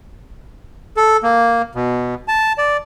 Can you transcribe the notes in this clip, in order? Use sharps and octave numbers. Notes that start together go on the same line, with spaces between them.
A4
A#3
B2
A5
D5